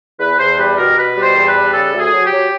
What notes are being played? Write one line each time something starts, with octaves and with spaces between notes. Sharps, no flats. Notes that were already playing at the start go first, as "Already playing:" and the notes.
E2 B4
E2 C5
G3 B4
B2 A#4
B2 B4
G3
C5
E2
B4
G3
C#3 A4
D2
G#4
F#3
G4
F#3